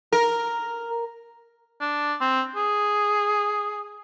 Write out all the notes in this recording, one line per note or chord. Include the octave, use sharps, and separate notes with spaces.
A#4
D4
C4
G#4